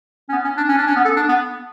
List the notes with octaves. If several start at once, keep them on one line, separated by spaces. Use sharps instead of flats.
C#4
B3
C#4
D4
C#4
D4
C#4
B3
A4
D4
B3